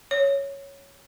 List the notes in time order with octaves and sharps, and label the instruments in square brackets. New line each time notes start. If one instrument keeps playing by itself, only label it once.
[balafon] C#5